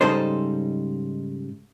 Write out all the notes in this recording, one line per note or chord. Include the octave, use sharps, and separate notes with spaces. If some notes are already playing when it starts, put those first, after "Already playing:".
G#2 C#3 G3 D#4 A4 C5